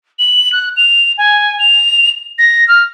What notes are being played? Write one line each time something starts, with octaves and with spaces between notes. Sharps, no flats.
F#7
F#6
F7
G#5
F7
A#6
F6